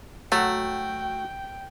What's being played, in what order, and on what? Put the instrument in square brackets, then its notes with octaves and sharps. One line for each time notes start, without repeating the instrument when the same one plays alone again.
[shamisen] F#3 [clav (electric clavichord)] A3 [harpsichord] F#4 [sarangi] G5